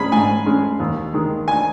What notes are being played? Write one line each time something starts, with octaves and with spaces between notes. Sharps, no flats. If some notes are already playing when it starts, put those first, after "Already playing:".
Already playing: G#3 C#4 G#4 B5
G#2 G#5
G#3 C#4
D#2
D#3 G#3
G#5